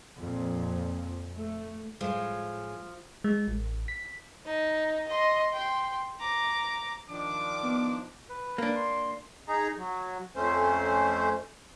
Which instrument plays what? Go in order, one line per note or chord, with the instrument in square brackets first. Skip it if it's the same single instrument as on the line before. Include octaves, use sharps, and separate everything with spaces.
[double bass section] F2 A#2
A3
[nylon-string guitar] A2 G#3 [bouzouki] F3
[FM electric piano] G#3
A1
B6
[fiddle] D#4
D#5 C6
G5 C6
A#5 D6
[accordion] D#3 F3 D4 [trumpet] D6
[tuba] B3
[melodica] B4
[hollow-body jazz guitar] A#3 D4
[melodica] C6
[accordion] D#4 G#4 A#5
F#3
F2 A3 C#4 C5